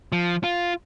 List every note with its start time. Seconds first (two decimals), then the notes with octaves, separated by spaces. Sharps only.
0.12 F3
0.44 F4